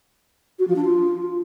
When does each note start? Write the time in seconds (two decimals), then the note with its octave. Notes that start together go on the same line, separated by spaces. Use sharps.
0.59 F#4
0.67 F3
0.75 D4
0.84 F4